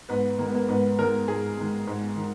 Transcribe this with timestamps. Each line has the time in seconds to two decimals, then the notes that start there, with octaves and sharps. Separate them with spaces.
0.09 G#2 B3
0.39 D#3 G#3 A#3
0.47 B3
0.54 A#3
0.69 G#2 B3
0.99 D#3 G#3 A#4
1.28 G#2 G#4
1.57 D#3 G#3
1.87 G#2
2.16 D#3